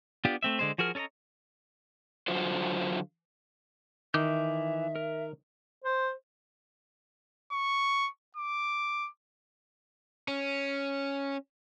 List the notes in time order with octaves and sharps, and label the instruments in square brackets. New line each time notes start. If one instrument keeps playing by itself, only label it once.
[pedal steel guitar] B3 D4 F4 G4
A3 C4 E5
D3 G#3 C5
F3 F#4 G#4 A#4 F6
C#4 A4 C#5 D#5 A#5
[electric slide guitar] D3 F#3 F4 F#4 C5
[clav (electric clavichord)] D#3 [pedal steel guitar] E3 D6 G6 [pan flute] E5
[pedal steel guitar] A#4
[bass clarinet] C5
[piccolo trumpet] C#6
D6
[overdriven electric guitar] C#4